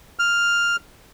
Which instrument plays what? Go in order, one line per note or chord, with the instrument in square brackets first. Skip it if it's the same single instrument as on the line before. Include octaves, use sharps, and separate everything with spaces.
[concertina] F6